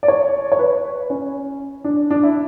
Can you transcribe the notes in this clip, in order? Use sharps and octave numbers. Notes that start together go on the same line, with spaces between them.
D5
C#5
C#5
B4
C#4
D4
D4
E4